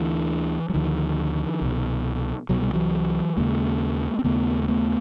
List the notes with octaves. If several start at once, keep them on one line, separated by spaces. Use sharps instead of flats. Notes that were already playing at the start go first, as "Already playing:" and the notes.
Already playing: D2 D3 E3
F#3
D2 D3 D#3 F3
C2 B2
C2 B2 F#3
G3
E3 F#3
D#2 C#3 G#3 A#3
C4
D#2 C#3 A3 B3
A#3
A3 B3